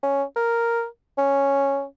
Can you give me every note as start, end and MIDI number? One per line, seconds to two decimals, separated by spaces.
0.03 0.23 61
0.36 0.85 70
1.18 1.85 61